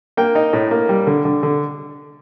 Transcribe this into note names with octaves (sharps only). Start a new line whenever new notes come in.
A#3 G5
D#4
A2
A#3
G3
D3
D3
D3